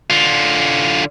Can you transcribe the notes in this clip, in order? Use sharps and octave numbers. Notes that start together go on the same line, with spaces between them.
D3 F4